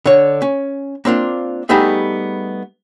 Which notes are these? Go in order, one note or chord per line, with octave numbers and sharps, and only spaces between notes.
D3 C#5
C#4
A#3 C4 D4 F4
G3 A3 B3 D#4 G#4 E5